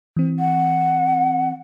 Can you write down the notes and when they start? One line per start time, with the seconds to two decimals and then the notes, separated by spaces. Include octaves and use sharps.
0.16 E3 C4
0.39 F#5